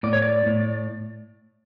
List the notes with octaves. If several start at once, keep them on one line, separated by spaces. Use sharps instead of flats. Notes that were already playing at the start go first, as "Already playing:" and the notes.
A2 D5
C#5
D5
A2